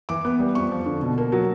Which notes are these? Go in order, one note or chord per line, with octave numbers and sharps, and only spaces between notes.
E3 D6
B3
G3
F2 C#6
F3
D3
B2
A#3
F#3